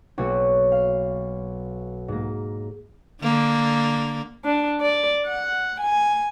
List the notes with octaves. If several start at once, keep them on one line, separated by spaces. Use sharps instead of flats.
B1 A#3 E4 F#4 C#5 C#7
F5
G#2 A#3
D3 A#3
D4
D5
F#5
G#5